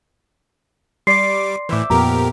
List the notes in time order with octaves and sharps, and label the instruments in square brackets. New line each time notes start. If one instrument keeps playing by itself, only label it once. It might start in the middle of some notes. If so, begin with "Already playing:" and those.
[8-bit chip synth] G3 D6 [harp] D5 [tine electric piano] C6 [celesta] C7
[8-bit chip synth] A2 E3 [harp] C5 E5 D6
[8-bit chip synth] F2 G4 A#4 [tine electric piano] A#2 B3 [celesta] A#5